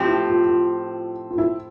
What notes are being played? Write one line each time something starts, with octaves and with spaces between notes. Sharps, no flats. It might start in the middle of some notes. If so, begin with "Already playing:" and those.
Already playing: A2 F3 C4 G4
E4
F4
F4
F4
E4